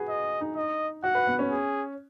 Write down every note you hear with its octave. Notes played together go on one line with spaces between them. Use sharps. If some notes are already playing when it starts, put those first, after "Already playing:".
Already playing: F#4 G#4 B4
D#5
D#4
D#5
F#4 F#5
B4
B3
C#4
G#4